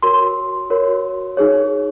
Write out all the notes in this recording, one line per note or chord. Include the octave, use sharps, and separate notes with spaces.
F#4 A#4 C#5 C6
F#4 A#4 C#5
D#4 G#4 C#5